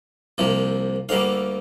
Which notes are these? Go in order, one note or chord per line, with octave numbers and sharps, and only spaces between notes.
C2 C3 F3 A#3
D2 D3 G3 A#3 F5